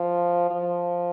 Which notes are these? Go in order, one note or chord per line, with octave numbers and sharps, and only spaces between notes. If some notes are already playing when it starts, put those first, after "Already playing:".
Already playing: F3
F3